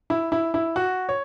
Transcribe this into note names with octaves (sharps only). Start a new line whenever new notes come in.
E4
E4
E4
F#4
C#5